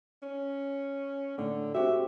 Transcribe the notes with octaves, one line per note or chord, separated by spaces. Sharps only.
C#4
A2 D3
C4 F#4 G4 E5